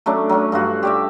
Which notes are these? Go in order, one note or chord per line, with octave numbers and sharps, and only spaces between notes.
F#3 A3 C#4 D4
F#3 C#4
G2 F4 F#4
G4 D5 E5